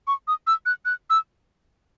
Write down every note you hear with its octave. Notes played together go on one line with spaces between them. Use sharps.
C#6
D#6
E6
F#6
F#6
E6